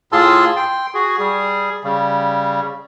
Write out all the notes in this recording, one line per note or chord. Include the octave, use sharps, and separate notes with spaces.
A2 F4 G#4 A5 C6 E6
G5 C6
F#4 G#4
G3 G#4
C#3 G3